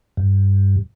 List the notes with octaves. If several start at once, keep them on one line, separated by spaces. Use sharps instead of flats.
G2